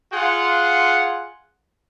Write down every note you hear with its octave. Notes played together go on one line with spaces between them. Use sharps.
F4 G#4 F#5